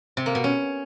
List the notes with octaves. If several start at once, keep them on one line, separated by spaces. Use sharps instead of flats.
C3
A#3
B2
C#4